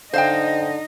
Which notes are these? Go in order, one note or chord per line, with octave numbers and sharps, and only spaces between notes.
D3 D#4 C5 D#5 F5 G5